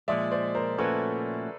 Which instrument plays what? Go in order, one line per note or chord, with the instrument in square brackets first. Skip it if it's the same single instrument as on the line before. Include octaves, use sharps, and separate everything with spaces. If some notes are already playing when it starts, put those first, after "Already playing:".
[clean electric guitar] A#2 F3 G#3 [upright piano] D5 E5
[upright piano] C5 D5
A#4 C5
[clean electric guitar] A#2 F3 A3 C#4 F#4 [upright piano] A4 B4